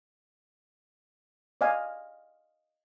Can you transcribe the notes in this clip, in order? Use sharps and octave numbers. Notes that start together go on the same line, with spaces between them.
D5 D#5 F5 G#5